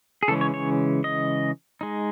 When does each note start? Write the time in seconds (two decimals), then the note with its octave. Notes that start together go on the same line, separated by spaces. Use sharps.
0.23 G#4
0.28 C#3 E3 G#3 C#4 A4
0.41 C#5
0.54 C#5
1.04 D#5
1.81 G#3 D#4